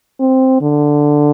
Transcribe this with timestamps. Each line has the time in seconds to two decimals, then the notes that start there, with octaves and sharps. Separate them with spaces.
0.20 C4
0.61 D3